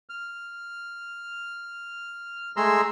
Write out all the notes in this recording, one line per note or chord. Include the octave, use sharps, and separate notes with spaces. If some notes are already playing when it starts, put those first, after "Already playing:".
F6
G#3 A3 G#4 A#5 C6 E6